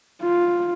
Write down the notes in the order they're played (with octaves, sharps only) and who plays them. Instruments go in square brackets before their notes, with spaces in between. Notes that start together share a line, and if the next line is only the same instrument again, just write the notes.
[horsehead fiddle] F4